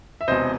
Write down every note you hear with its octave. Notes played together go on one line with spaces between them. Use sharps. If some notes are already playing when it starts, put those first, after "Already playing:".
E5
E1 E2 C3 C5 D#5